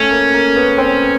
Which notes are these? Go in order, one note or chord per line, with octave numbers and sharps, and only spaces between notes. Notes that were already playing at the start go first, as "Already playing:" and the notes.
Already playing: A3 C#4
A#3
A#3
B3
C4